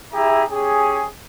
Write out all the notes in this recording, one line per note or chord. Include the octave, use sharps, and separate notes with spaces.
E4 G4 G#4 E5 A#5
C#4 G4 G#4